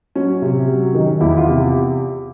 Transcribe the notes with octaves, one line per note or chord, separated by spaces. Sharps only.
F#3 C#4
C3
F#3
D#3
E2 E4
F4
C3